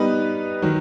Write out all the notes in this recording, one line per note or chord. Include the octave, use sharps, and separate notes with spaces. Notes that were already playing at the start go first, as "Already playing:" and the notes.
Already playing: G3 B3 D#4 G4 B4
D#3 F#3